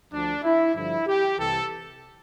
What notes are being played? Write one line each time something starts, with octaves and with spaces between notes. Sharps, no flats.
D2 D3 F3 D4
E4
G2 D3 F3 E4
G4
C2 C3 E3 A4